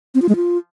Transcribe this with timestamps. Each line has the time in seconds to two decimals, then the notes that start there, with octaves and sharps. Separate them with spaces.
0.15 C4
0.22 F4
0.29 G#3
0.36 F4